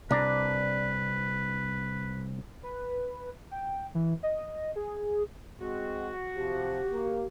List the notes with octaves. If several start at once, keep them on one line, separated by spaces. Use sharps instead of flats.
C2 D4 B4 D5 A#5
B4
G5
E3
D#5
G#4
G#3 C4 F#4
C3 F3 G4
A#3